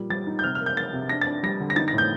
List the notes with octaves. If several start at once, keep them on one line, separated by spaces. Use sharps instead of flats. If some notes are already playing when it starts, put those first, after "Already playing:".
Already playing: A#2 G3
G3 A6
D#4
G6
C3 F6
F6
A#3
G6
A#3 A6
C3
D4 A#6
A6
D4
G3 A#6
D3
A#6
D#4 A6
A#6
A2
G6